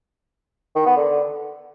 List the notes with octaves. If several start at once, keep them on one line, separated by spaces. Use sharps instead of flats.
D#3
B3
D3